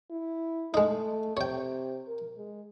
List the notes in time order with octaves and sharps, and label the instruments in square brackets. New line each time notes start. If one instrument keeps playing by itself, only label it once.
[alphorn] E4
[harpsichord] G#3 D#4 [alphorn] A3
[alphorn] C3 [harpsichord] C#5 G5
[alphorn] A#4
G#3